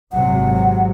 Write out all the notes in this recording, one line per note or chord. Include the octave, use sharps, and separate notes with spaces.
G#1 C3 F#3 F#5